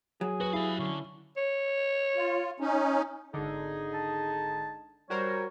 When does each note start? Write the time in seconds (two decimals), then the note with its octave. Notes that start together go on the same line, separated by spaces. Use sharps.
0.21 F#3 G#4
0.40 F#4 B4
0.53 E4 G4 F5
0.80 D3 C#4
1.37 C#5
2.16 F4
2.60 C#4 D#4
3.34 G#1 D3 D#4 G#4
3.94 A5
5.10 G3 F#4 A#4 C5 C#5